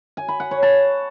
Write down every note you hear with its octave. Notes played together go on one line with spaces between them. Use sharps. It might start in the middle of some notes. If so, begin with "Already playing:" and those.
G#5
B5
F#5
C#5
A5